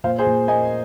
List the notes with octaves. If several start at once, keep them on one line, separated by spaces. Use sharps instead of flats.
A#2 C5 F5
G#4 C5
A#2
A#3 D#5 G#5